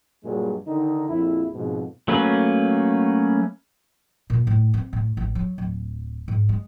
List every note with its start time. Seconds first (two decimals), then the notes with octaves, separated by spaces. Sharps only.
0.23 G2 A#2 F#3 G#3
0.66 D3 D#3 D#4
1.08 A#1 F2 E4
1.53 F2 G#2 B2
2.08 F#3 A3 A#3 C#4 B4
4.30 A#2
4.47 A2
4.74 C4
4.93 A2
5.17 A1
5.35 F#3
5.58 D1
6.28 G#2
6.49 G#3